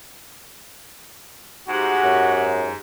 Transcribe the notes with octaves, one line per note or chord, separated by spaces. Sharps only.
G#2 F#4 G4 F#5
F#2